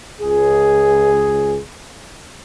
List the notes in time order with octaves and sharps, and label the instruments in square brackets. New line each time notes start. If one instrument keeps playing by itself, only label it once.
[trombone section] C#2 G#4